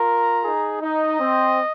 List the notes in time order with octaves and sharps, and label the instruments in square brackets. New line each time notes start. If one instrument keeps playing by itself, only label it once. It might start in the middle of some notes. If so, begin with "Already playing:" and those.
Already playing: [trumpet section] F4 A#4 [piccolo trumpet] A#5
[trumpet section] D#4 G#4
[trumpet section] D#4 [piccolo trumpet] D#5
[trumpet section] C4